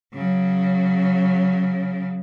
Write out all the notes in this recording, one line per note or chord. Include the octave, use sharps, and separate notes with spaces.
C#3 F#3